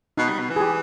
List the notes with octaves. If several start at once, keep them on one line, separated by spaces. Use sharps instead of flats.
B2 D#4
G3
B2
E3
G#4
G4